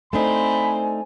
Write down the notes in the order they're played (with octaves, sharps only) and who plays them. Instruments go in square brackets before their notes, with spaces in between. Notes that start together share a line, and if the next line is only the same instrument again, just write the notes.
[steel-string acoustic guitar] A3 D4 D#4 [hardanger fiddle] C4 C5 [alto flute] G#5 [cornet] B5